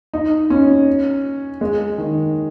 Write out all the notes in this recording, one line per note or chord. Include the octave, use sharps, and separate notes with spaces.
D#4
C#4
G#3
D#3